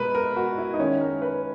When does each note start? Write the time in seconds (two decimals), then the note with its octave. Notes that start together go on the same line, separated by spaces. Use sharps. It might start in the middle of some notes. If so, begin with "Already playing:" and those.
Already playing: B2 G#3 A#4 B4
0.15 A#4
0.37 F#4
0.58 E4
0.74 D#4
0.79 D#3 G#3 C#4
1.00 A#4
1.22 B4